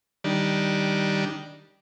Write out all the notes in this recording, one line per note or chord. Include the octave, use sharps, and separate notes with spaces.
D#3 G3 D4